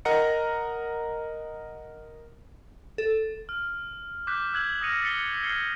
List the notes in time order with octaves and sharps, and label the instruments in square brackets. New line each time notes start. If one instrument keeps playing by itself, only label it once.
[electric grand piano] A#4 D#5 F#5 A#5 C#7
[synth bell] A4
[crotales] F6
D6 F#6 G6 B6
E6 F#6 G#6 F#7
D#6 F6 A#6 C#7 D#7 F7
A6 B6 C#7 G7
F6 G#6 C7 C#7 G7